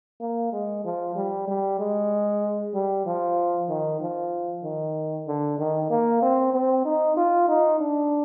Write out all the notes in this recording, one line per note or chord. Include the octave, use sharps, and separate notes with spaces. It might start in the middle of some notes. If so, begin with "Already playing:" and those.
A#3
G#3
F3
G3
G3
G#3
G3
F3
D#3
F3
D#3
D3
D#3
A#3
C4
C4
D#4
F4
D#4
D4